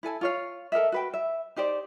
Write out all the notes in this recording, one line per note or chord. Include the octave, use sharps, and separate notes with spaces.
E4 A4 G#5 A5
F4 C#5 F5
A4 A#4 D#5 E5
F#4 B4 G5
E5
D#4 G4 C5 D5